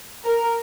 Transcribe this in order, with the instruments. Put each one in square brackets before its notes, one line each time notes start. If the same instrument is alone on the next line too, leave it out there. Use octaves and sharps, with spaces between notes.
[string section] A#4